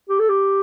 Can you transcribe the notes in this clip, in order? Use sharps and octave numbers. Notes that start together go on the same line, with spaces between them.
G4
A4
G4